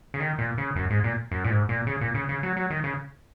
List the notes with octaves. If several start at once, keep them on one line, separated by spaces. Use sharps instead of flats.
C#3
D#3
A#2
C#3
F#2
G#2
A#2
F#2
A#2
G#2
A#2
C#3
A#2
C#3
C#3
F#3
F#3
D#3
C#3